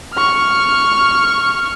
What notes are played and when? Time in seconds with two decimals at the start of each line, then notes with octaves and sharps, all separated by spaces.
0.14 C#6 F6